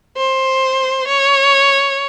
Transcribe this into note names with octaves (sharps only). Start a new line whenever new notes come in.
C5
C#5